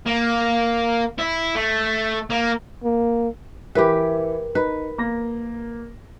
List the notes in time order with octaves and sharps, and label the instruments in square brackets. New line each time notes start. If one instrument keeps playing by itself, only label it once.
[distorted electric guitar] A#3
E4
A3
A#3
[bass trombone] A#3
[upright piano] E3 E4 [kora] G4 B4 [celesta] A#4
[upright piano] D#4 [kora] B4
[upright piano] A#3 A#6